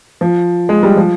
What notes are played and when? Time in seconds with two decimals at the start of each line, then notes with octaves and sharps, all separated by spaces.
0.21 F3
0.69 G#3
0.83 G3
0.97 F3